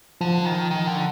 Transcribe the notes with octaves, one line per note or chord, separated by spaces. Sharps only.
D3 F3
D#3
D#3
D3